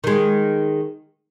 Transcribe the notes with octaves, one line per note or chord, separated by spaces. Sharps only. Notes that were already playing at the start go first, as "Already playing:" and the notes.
D#3 G#3